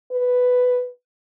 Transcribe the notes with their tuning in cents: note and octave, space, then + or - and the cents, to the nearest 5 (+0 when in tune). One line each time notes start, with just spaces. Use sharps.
B4 +5